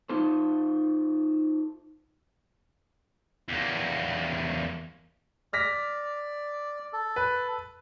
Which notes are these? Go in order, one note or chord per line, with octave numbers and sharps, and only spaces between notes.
D#4 F4 A4 C5
E2 A#3
D5 F6 A#6 B6
A4
B4